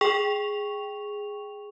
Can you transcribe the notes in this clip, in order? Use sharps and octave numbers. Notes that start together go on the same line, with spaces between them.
G#4 G5 C#6 F7